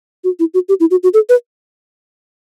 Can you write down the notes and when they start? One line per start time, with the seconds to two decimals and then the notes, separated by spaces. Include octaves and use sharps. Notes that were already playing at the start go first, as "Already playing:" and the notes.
0.24 F#4
0.39 E4
0.54 F#4
0.69 G4
0.80 E4
0.91 F#4
1.03 F#4
1.14 A4
1.29 B4